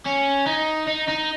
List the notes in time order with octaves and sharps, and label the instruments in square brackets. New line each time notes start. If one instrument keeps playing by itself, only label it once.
[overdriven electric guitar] C#4
D#4
D#4
D#4